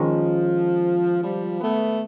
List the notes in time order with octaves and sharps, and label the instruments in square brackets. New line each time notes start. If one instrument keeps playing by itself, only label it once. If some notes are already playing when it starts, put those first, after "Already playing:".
Already playing: [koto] D#3 G#3 C#4 [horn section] F3
[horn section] F3 G3
A3 B3